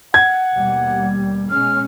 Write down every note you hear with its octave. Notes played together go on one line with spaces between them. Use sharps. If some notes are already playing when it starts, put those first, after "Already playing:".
F#5 G#6
D#2 B2 G3
B2 G#3 C#4 F6